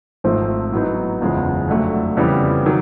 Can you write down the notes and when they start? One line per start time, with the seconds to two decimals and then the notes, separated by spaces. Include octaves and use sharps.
0.24 G#1 G#2 F3 A3 C4
0.72 A2 F#3 B3 D#4
1.21 F#1 E2 C#3 F3 G#3
1.68 F2 D3 F#3 A3
2.17 F2 C#3 E3 G3 B3
2.66 D#3 F#3